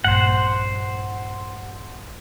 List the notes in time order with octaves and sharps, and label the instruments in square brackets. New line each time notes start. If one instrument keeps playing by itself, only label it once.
[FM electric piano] A#1 G2 [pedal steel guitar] C5 F#5